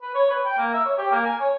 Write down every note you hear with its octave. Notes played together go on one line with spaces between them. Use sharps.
B4
C#5
B4
G5
A#3
E5
C#5
G4
A#3
G#5
C#5